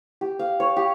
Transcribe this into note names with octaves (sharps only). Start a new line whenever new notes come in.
G4
F5
C#5
G4